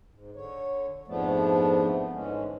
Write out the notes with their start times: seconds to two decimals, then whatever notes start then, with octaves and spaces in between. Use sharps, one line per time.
0.14 G#2
0.35 D3 C#5
1.08 F2 G#2 F3 A3 B3 D4
2.13 G#2 D3 E3 G#3 C#4